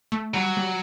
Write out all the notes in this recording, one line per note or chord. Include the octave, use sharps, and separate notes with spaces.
A3
F#3 G3
G3